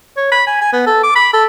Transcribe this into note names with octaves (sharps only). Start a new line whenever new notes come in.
C#5
B5
G#5
G#5
B3
A4
D6
B5
A4